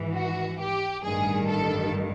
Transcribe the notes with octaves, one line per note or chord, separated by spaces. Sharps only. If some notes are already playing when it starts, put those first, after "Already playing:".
Already playing: G#1 G#2 E3
F#4
G4
A1 G2 D#3 G#4
A4